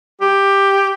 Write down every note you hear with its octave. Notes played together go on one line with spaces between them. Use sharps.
G4